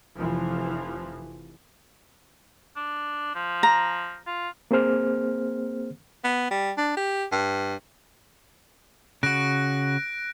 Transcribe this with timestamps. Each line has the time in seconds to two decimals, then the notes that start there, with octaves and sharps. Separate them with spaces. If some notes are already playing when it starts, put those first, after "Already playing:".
0.16 F1 E3 F3
2.76 D4
3.35 F3
3.63 A#5
4.27 F4
4.71 A#3 C4 G#4 C5 F6
6.24 B3
6.51 G3
6.77 D4
6.97 G4
7.32 G2
9.23 C#3 F#4 F#6 A#6 D7